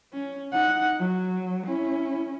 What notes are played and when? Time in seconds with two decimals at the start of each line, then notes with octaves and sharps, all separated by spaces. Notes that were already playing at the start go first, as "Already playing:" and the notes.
0.13 C#4
0.52 D#4 F#5
0.99 F#3
1.66 C#4 E4